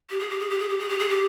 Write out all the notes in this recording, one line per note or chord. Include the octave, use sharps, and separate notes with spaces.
G4
G#4
G4
G#4
G4
G#4
G4
G#4
G4
G#4
G4